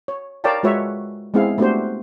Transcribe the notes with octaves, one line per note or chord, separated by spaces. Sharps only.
C#5
A#4 C#5 D5 F5 G5 A5
G#3 F4 F#4 B4 C#5 E5
G#3 B3 C4 E4 G#4 F5
A3 B3 D4 F#4 G4 C5